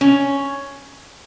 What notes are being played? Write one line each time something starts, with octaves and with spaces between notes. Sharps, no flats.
C#4